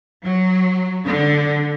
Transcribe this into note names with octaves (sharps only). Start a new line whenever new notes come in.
F#3
D3